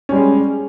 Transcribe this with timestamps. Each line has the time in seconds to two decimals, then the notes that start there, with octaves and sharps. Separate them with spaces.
0.09 C#4
0.12 G3
0.16 G#3